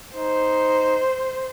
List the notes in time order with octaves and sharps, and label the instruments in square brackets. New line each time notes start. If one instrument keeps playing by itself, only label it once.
[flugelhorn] D#4 [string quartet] C5